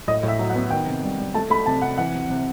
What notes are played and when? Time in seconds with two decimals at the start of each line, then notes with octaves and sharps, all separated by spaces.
0.07 A2 D#5
0.23 A2
0.28 E5
0.39 F#3
0.50 F#5
0.55 B3
0.70 D#3 G5
0.86 C3
1.03 G3
1.18 G3
1.34 A3 A5
1.50 A3 B5
1.66 C3 A5
1.82 C3 F#5
1.98 E3 F#5
2.14 C3
2.30 C3